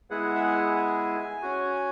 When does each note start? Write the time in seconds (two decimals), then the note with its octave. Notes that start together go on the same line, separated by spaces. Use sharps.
0.10 G#3 B3 E4 G#4 F#5
0.36 E5
0.43 F#5
0.76 G#5
1.42 C#4 F#4